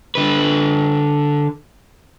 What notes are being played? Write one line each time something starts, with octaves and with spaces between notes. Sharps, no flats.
D3 B4